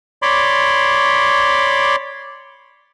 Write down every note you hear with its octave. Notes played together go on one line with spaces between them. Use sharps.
C#5 D5 B5 C6 D6